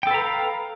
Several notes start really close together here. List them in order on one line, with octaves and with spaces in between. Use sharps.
G5 A4 B4 A#5 F5